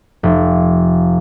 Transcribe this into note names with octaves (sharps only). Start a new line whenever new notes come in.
F1